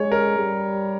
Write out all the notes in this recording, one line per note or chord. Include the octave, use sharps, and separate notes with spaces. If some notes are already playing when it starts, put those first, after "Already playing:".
Already playing: G#3 C#5
A#4
G3